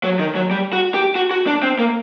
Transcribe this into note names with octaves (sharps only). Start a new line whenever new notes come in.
F#3
D#3
F#3
G3
F#4
G4
F#4
F#4
D4
C4
A#3